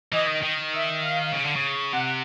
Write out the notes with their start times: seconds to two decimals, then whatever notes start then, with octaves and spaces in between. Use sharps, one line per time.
0.12 E3 D#5
0.27 D#3
0.43 D#3
0.73 E5
1.02 F5
1.32 C#3
1.45 D3
1.56 C#3
1.93 C3 F#5